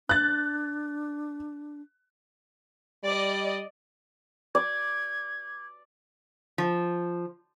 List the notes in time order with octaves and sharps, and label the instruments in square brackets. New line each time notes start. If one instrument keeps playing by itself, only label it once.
[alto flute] D4 [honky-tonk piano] F#6 A6
[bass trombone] G3 [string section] D5 D#5
[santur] D5 [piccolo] G#6
[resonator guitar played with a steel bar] F3